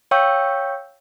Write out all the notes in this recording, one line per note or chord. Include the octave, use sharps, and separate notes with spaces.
C#5 F5 G5 C#6 E6 G6